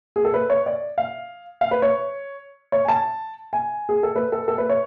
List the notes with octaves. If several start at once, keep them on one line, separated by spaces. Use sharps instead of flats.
G#4
A4
B4
C#5
D5
F5
F5
B4
C#5
C#5
G#5
A5
G#5
G#4
A4
B4
A4
A4
B4
C#5